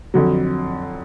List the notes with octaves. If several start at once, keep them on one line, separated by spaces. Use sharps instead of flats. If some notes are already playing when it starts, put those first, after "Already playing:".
F2 D3 F#3